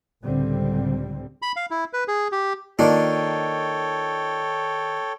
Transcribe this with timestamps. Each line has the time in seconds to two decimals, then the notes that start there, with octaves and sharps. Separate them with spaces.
0.23 C#2 A2 D3 G3 C4
1.42 B5
1.56 F5
1.71 E4
1.93 B4
2.08 G#4
2.32 G4
2.79 D#3 A#3 D4 D#4 F4 A4 C#5 G5